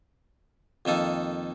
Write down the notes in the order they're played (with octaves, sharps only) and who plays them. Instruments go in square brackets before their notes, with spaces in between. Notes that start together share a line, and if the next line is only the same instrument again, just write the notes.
[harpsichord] F2 D#3 A#3 D#4 A4